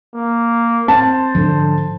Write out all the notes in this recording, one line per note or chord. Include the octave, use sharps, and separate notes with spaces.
A#3
C4 C5 A5
G#2 D3 F3